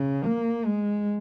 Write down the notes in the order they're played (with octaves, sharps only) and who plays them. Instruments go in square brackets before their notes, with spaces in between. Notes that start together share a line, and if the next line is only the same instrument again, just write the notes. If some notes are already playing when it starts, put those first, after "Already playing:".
Already playing: [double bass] C#3
A#3
G#3